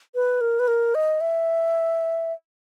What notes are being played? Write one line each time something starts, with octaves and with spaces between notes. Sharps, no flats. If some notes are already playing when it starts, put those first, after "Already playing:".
B4
A#4
B4
A#4
D#5
E5